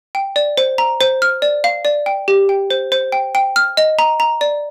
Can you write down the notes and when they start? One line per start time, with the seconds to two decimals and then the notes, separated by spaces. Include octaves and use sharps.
0.15 G5
0.36 D5
0.57 C5
0.78 A#5
1.01 C5
1.22 F6
1.42 D5
1.64 F5
1.85 D5
2.06 G5
2.28 G4
2.49 G5
2.70 C5
2.92 C5
3.12 G5
3.35 G5
3.56 F6
3.77 D#5
3.99 A#5
4.20 A#5
4.41 D5